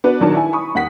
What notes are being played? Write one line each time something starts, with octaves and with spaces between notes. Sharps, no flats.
B3 D4 F#4 B4
A#1 D#3 F#3 D4 A5
E4 G#5
B5 C#6 D#6
D#2 F#5 B6